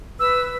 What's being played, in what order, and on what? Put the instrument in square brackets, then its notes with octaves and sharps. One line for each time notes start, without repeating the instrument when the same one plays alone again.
[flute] B4 [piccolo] E6